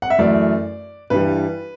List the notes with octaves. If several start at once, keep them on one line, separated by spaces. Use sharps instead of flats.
F#5
E5
F#2 E3 A3 D5
G2 E3 G3 B4